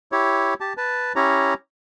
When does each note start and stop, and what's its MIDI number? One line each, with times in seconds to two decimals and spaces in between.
0.12 0.54 64
0.12 0.54 67
0.12 0.54 73
0.60 0.73 67
0.60 0.73 81
0.77 1.13 71
0.77 1.13 81
1.16 1.54 61
1.16 1.54 64
1.16 1.54 67
1.16 1.54 73
1.16 1.54 82